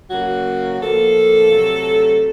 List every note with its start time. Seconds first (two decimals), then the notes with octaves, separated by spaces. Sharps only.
0.09 C#3 F#3 A#3 F#4
0.73 F#4
0.80 A2 F3 A#3 A4
1.50 C3 F#3 A3